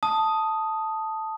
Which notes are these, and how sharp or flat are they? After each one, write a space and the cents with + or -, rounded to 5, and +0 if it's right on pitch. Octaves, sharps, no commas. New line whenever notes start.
A5 +0 D#6 +0